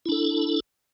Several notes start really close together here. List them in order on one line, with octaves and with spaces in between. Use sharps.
E4 D4 A4